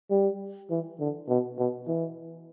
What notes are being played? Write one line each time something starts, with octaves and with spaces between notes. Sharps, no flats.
G3
E3
D3
B2
B2
E3